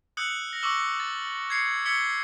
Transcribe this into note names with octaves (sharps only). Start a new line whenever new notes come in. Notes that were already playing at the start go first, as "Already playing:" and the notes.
D#6 E6 F#6 G6 C#7 F#7
F6 A#6
C#6 D6 E6 F#7 G7
A6
G#6 C7 C#7
C#6 E6 G#6 B6 C#7 G7